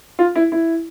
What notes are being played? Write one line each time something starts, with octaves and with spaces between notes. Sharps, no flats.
F4
E4
E4